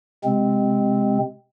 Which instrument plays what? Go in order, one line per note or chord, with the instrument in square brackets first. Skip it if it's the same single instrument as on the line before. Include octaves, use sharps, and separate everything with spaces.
[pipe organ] C3 G#3 C4